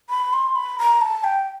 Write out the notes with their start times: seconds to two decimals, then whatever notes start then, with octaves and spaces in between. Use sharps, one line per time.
0.10 B5
0.33 C6
0.56 B5
0.79 A#5
1.01 A5
1.24 G5